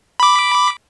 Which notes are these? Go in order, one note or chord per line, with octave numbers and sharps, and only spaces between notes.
B5 D6